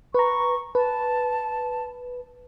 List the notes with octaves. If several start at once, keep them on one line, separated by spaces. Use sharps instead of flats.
B4 A#5 C#6
B4 A5